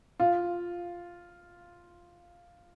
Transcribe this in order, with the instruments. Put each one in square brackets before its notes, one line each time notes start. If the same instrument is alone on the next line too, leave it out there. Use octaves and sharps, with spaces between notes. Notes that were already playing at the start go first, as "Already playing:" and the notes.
[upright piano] F4